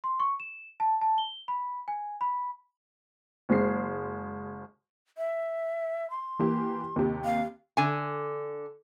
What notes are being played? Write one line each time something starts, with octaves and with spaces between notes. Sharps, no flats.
C6
C#6
E7
A5
A5
G7
B5
G#5
B5
F#1 G#3 C7
E5
C6
E3 A#3 G4
D#2 C3 G4
F5
D3 G#5